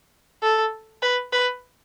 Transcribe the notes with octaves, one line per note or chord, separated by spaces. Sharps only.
A4
B4
B4